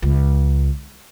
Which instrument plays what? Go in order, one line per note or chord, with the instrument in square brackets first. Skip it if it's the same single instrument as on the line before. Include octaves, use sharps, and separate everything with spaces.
[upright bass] C#2